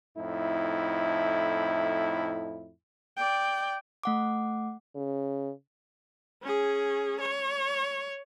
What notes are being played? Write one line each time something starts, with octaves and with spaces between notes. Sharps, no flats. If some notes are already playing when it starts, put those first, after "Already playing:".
F2 A2 D#4 E4
D5 G5
A3 F#5 D6
C#3
C#4 G#4
C#5